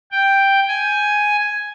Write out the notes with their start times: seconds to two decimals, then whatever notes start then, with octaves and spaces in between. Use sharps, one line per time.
0.12 G5
0.68 G#5